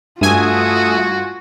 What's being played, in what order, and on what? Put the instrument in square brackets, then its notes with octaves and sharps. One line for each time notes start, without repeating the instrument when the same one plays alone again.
[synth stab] G2 G#5 [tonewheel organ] A3 E5 D#6 [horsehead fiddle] F4 [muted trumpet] F#4